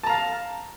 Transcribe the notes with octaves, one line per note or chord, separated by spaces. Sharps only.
F5 A5 A#5